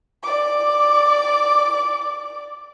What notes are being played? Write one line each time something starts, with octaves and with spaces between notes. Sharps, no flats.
D5 D6